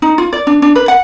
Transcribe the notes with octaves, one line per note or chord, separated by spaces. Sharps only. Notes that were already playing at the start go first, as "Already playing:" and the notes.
D#4
F4
D5
D4
D4
B4
F#5